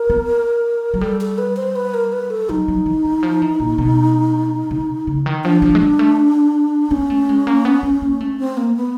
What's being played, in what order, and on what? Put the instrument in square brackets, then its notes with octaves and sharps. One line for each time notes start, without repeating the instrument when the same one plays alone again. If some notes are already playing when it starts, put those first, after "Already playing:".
Already playing: [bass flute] A#4
[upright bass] B3
F#3
[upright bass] G3 [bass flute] A4
[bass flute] A4
B4
C5
B4
A#4
B4
A4
[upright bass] F#3 [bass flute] D#4
[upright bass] F#3
E3
E3
F3
E3
A#2
B2
C3
C#3
D#3
[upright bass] F3 [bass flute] D4
[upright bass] F3
G#3
G3
A3
[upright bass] B3 [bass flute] C#4
[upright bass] A3
G#3
A#3
B3
B3
A#3
A3
[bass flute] C4
A#3
B3